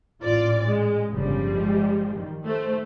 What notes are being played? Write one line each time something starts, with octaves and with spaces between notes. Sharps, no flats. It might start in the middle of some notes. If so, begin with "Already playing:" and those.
A1 A#2 F4 D5
G#3
G1 G2 C#3 F3 G3
G#3
D#3
A3 C5